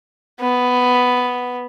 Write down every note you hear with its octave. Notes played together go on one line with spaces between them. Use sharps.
B3